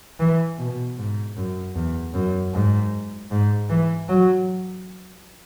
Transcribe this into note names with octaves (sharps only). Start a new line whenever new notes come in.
E3
B2
G#2
F#2
E2
F#2
G#2
G#2
E3
F#3